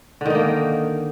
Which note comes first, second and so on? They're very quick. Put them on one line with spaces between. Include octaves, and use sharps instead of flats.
D3 D#3 D#4 A#3